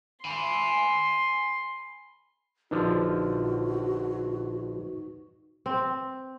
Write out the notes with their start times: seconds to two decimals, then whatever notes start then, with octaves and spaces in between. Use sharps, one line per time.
0.25 G#5 B5 C6
2.71 A#1 D3 F3 D#4 F#4 B4
5.66 C4